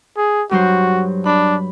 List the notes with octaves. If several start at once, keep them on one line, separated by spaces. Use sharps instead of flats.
G#4
G2 F#3 F#4 C5
D4 B5